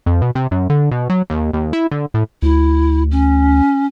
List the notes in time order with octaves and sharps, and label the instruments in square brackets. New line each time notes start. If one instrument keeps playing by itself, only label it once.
[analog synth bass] F2
B2
C3
F#2
D3
B2
F#3
D#2
D#2
E4
D3
A2
[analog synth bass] D2 [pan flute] E4
[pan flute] C#4